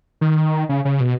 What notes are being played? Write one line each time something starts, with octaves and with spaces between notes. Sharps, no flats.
D#3
C#3
C#3
B2